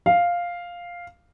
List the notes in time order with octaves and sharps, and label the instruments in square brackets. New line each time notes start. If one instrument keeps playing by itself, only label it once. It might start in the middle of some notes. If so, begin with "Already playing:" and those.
[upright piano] F5